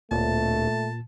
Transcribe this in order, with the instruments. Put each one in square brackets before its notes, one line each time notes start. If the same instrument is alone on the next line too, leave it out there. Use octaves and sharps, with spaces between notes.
[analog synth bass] D1 [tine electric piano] A#2 [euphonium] A3 [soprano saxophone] A5